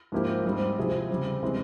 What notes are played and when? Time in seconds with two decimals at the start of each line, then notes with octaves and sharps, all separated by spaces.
0.12 G#2 F3 A#3 E4 G4
0.44 G#2 G3 C4
0.78 C3 F3 C4 E4 G#4
1.10 C#3 G3 C4
1.43 C3 E3 G#3 C4